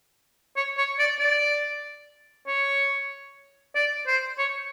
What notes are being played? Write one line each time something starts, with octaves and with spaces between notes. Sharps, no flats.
C#5
C#5
D5
D5
C#5
D5
C5
C#5